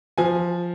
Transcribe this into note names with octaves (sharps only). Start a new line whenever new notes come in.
F3 G#5